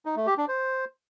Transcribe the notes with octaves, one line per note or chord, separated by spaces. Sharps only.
D#4
A3
G4
D4
C5